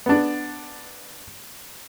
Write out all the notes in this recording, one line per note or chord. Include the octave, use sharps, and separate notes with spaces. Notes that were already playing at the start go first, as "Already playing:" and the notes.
B3 D4